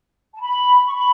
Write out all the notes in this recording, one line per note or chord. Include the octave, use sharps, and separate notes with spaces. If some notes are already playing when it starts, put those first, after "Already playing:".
A5
B5
C#6
B5